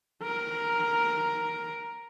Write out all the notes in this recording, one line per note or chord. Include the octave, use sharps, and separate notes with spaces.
A#4